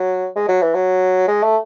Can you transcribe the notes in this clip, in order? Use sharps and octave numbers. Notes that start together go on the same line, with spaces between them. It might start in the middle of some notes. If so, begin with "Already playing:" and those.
Already playing: F#3
G#3
F#3
E3
F#3
G#3
A3